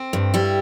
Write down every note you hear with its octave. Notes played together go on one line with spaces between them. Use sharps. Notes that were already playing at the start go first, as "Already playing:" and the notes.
Already playing: C4
G2
G3 E4